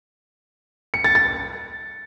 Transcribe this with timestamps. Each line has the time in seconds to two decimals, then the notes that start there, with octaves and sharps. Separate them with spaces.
0.94 C#7
1.04 A6
1.15 A6